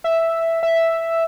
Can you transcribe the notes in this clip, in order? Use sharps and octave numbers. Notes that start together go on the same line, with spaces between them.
E5
E5